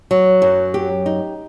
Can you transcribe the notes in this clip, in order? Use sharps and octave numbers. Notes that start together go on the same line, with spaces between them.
F#3
F#2
G4
D#4